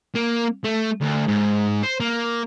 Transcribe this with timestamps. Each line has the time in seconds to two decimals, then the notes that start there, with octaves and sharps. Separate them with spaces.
0.15 A#3
0.64 A3
1.01 D2
1.27 G#2
1.83 C5
2.00 A#3